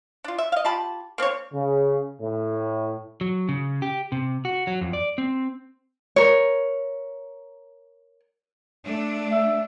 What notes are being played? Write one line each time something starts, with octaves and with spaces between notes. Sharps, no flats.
D4 F4
E5
D#5 F5
F4 G4 A5 B5
A#3 C4 D4 C#5
C#3
A2
F#3
C#3
G4
C3
F#4
F#3
F2
D5
C4
A#4 C#5
A3 D4
E5